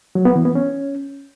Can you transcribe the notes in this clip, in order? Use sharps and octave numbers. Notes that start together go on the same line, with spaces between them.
F#3
B3
E3
B3
C#4